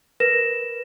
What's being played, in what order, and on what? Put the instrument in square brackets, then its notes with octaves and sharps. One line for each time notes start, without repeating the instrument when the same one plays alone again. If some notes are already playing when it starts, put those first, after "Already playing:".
[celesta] A#4 B4 A#6 E7